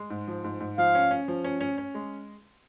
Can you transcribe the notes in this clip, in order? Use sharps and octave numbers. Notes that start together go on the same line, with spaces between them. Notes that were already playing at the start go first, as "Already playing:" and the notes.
Already playing: G#3
G#2
F3
G#2
G#2
F3 F5
C#4
C#4
F3
C#4
C#4
C#4
G#3